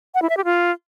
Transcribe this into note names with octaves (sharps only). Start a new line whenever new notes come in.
F#5
E4
E5
G4
F4